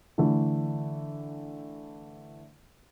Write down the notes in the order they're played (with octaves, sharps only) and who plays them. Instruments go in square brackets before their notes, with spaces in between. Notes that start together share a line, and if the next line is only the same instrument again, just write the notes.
[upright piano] D3 E3 A3